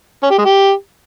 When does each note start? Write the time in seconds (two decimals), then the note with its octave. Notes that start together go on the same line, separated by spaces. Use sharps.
0.23 C#4
0.31 G4
0.38 G#3
0.46 G4